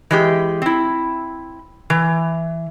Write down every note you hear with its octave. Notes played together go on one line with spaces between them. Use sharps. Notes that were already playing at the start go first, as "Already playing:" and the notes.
E3 G#3 G4
C4 E4
E3